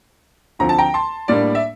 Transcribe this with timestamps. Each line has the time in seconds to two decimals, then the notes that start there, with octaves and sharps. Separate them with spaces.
0.59 D2 D3 F3 C4 A#5
0.69 A5
0.78 G5 A#5
0.94 A5 C6
1.28 A2 G3 A#3 D4 D5
1.55 E5